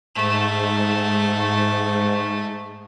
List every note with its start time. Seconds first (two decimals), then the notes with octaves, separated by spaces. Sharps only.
0.16 G#2 A3